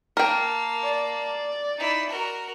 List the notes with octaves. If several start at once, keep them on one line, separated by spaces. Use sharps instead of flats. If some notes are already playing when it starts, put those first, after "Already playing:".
A#3 A#4 G5 A5
D5
D#4 E4
F#4 A#4